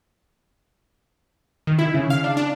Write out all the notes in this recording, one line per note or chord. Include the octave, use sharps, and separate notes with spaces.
D#3
E4
C#3
F5
D4
D4